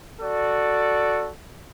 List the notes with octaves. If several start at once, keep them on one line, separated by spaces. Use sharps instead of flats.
F#4 A4 D5